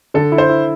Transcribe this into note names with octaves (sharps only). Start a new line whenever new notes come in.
D3 A4
E4
C5
E4